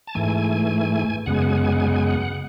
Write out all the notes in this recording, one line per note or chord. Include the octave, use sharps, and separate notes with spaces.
A5
G#2 E3 A3 G#5
F#2 C#3 G#3 B3 F#5
G#5
F#5
G#5
F#5
G#5
F#5
G#5
F#5
G#5
F#5